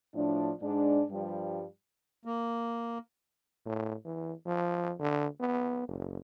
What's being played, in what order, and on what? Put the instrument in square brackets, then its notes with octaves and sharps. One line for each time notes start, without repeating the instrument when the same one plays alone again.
[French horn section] A2 F3 D4
G#2 G#3 D4
G2 F3 G3
[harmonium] A#3
[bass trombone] A2
E3
F3
D3
B3
F#1